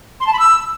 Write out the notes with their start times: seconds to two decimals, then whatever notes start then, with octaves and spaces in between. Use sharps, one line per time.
0.20 C6
0.27 A5
0.33 B5
0.39 E6